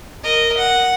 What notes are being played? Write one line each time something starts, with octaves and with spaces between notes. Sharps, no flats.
A#4 D#5
F#5